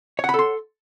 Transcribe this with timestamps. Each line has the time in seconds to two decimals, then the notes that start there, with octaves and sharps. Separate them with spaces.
0.19 C#5
0.24 F#5
0.29 B5
0.34 A4
0.39 C6